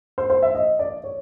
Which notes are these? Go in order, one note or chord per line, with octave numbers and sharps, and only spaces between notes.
C5
C5
E5
D#5
D5
C#5